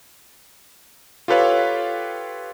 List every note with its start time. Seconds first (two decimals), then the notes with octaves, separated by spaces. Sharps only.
1.28 F4 G4 A4 B4 C#5 F5